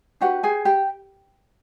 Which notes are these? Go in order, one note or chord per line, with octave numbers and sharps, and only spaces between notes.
D4 F#4 G4 B4 F#5
G#4 G#5
G4 G5